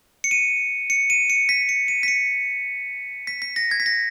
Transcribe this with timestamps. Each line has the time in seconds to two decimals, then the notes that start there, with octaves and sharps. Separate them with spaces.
0.24 C#7
0.31 D#7
0.90 C#7
1.10 D#7
1.30 C#7
1.49 B6
1.69 C#7
1.88 D#7
2.03 B6
2.08 C#7
3.27 B6
3.42 B6
3.56 A#6
3.71 G#6
3.80 B6
3.86 A#6